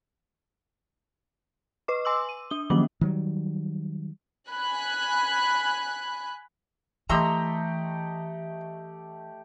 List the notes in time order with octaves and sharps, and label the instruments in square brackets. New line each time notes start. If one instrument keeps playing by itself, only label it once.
[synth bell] B4 D#5 D6
G#5 C6 D6 E6 F#7
D#7
D4 G7
D#3 F3 F#3 A#3 C#4 F#7
[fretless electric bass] D#3 F#3 G3
[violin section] G#5 B5 F#6
[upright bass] E3 [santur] A3 G4 D#5 [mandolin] A#5 C6 E6